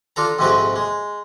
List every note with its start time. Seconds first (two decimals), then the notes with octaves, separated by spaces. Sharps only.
0.16 D4 F4 A4 A#5
0.39 A#1 F2 G#2 C3 C4 F#4
0.76 G#3